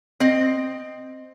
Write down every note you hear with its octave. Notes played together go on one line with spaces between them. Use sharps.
C4 D#5